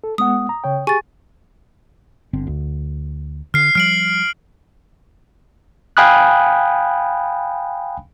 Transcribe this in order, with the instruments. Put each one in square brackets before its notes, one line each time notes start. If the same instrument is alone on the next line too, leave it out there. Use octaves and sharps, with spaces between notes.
[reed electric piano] A4
[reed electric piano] G#3 B3 F#5 [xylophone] D#6
[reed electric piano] A#5
C#3 C#5 G5
[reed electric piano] G4 G#4 C#6 [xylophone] G#5 A6
[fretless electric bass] G1 D3 C4
D2
[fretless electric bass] D3 [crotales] F6 C7
[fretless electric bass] F3 G3 [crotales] F6 D7 F#7
[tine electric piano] F5 G5 G#5 B5 D#6 F#6